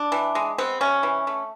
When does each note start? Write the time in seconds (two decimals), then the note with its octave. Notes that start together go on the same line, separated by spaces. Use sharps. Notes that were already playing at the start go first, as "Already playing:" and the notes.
Already playing: D4
0.12 E3
0.35 G#3
0.58 B3 C4
0.81 C3 C#4
1.03 E3
1.27 A3